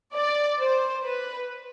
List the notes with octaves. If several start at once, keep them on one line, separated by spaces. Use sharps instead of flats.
D5
C5
B4